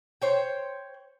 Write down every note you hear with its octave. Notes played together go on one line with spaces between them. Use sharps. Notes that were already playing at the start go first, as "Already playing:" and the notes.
C5 C#5 G5